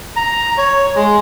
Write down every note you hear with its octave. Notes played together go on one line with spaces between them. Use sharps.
A#5
C#5
G#3